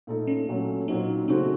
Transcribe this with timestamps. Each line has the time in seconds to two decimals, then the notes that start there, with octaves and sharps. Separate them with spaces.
0.07 A#2 A3 D#4 A4
0.27 C#4
0.48 A#2 F#3 A3 C#4
0.88 A#2 F#3 C4 D#4
1.28 C#3 A3 C4 D#4 F#4